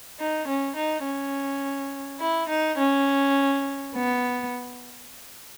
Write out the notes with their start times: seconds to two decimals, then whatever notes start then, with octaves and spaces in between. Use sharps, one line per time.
0.19 D#4
0.47 C#4
0.76 D#4
1.05 C#4
2.21 E4
2.49 D#4
2.78 C#4
3.94 B3